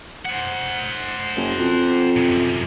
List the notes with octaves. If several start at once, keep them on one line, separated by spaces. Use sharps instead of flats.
C5 F#5
F#1
F2
F#2 C3